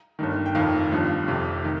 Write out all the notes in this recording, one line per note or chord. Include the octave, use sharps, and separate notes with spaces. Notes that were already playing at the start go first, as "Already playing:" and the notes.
G1 G2 D#3
G5
F1 F2 D#3 F5
G1 G2 F3
F1 F2 C3
D#3